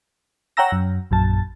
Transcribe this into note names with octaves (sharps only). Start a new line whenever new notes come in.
C#5 F#5 G5 A#5 E6 A#6
F#2
A#1 F#2 A5